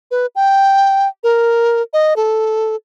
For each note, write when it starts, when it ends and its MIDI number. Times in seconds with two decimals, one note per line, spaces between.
0.11 0.26 71
0.35 1.08 79
1.23 1.82 70
1.93 2.14 75
2.16 2.76 69